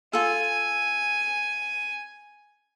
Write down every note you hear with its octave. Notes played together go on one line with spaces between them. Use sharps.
F4 A4 G#5